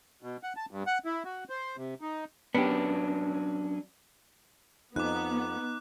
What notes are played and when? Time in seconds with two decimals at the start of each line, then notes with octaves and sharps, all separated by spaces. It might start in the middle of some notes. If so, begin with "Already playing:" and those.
0.23 B2
0.43 F#5
0.57 A5
0.71 G2
0.87 F#5
1.05 E4
1.25 F#4
1.50 C5
1.77 C3
2.01 D#4
2.55 F#3 B3 C#4 D4 G4
4.96 F2 B3 D#4 D6 F#6